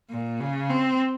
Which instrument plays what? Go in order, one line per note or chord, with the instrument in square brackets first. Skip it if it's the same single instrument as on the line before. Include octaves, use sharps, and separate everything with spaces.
[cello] A#2
C#3
C4